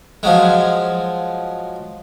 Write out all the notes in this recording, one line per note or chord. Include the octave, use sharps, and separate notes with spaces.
F3 F#3 G#3